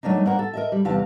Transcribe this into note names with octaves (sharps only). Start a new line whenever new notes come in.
F#3 A3 A#3 D4 D#4
G2 A#3 A#4 C5 F#5 A#5
A4
A#4 D#5 E5
G3
E2 C3 F5 A5